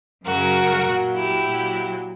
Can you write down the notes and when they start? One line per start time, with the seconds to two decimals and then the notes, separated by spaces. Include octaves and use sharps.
0.25 F#2 C#3 F#3 F#4 A#4
0.85 A#2 F#3
1.14 E4 G4
1.45 A#2 F#3